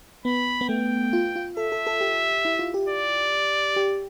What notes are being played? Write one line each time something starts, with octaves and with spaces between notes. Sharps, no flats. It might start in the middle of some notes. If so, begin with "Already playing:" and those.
B3 B5
B3
A3 G5
F4
F4
A4 E5
A4
A4
G4
E4
F4
G4
D5
G4